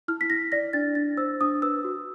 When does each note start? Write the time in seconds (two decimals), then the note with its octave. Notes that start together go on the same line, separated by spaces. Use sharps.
0.08 E4 F6
0.21 B6
0.30 E4 A#6
0.52 D5 A#6
0.73 D4 A6
0.95 D4 A6
1.17 C5 E6
1.41 D4 D#6
1.62 B4 E6
1.84 F#4